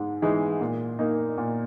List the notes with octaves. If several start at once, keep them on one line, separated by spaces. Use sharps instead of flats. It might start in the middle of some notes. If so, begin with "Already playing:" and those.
Already playing: G#2 G#3
E3 G#3 D#4
A#2
A#3 D#4
A#2